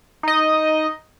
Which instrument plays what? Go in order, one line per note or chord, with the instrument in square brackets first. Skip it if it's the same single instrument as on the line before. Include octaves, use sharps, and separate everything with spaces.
[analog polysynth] D#4 D#5